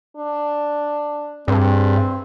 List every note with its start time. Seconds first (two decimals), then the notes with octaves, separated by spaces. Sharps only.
0.17 D4
1.48 G2 C4 G#4